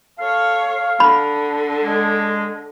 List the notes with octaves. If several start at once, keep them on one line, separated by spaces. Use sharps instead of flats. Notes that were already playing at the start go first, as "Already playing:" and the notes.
A4 C#5 F5
D3 B5
G#3